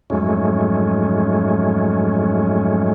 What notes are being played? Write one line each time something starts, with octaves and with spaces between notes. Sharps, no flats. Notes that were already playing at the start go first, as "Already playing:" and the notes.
F2 G#2 F#3 G#3 A3 C#4